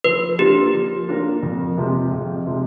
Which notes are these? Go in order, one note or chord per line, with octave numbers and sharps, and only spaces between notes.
F3 B4
A#3 D4 F4 G4 A#4
F3
A#3 D4 F4 A#4
F2
C3 F3 G#3
F2
C3 F3 G#3